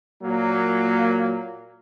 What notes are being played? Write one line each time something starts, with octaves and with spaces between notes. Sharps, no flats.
A#2 F#3 A#3